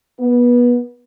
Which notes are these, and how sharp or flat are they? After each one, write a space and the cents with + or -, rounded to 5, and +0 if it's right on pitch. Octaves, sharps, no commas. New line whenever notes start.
B3 -25